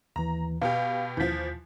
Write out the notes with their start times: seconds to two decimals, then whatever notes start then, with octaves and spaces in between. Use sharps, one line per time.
0.16 D#2 E3 A#5
0.62 B2 G4 F5
1.17 D#2 E3 F3 G6 B6